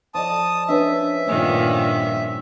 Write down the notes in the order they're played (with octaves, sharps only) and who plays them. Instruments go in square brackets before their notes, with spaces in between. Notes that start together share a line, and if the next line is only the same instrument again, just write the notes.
[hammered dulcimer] F3 D5 D#5 [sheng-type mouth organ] A5 D#6
[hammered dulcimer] C#4 D#5 [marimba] D4 B4 C#5 [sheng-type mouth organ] E5
[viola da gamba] G2 A#2 D#3 [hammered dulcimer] C#4